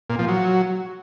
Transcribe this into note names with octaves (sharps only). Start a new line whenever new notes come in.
A#2
F3
F#3